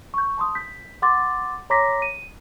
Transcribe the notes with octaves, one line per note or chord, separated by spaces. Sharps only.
C#6 G6
A5 C6 D#6
G6 B6
F#5 C6 D6 A6
C#5 A#5 C6 D6 A#6 B6
D#7